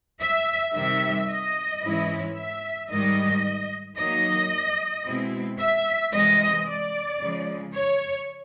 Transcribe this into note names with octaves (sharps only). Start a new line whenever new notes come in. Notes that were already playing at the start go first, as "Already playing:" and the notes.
E5
C3 D#3 G3 E5
D#5
G#2 E3 G#3 C#4 E4
E5
G#2 D#3 G3 D#5
D#3 F#3 A#3 D#4 D#5
B2 G#3 C4 E4
E5
C3 E3 G#3 D#5
D5
C#3 F3 G#3
C#5